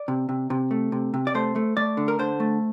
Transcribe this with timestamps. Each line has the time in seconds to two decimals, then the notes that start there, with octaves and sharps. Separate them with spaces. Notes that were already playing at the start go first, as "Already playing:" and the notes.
Already playing: D5
0.08 C3
0.29 C3
0.50 C3
0.71 A3
0.92 C3
1.14 C3
1.27 D5
1.35 A3 C5
1.56 A3
1.77 A3 D5
1.97 D3
2.08 A#4
2.19 D3 C5
2.40 A3